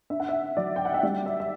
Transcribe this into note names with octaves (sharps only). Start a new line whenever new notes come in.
D4 E5
F#5
E5
F#3 D5
G5
F#5
E5
G3 D5
E5
E5